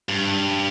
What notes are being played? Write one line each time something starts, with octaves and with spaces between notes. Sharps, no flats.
G2